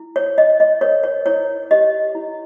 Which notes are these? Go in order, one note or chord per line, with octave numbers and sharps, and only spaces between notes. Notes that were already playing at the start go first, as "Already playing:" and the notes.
Already playing: E4
C#5
C#5 D#5
D#5
A#4 C#5
C#5
E4 C#5
G4 D#5
E4